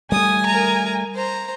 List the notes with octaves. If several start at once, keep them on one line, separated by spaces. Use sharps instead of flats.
G3 A3 G#5 D#6
A#4 A#5
C5 A#5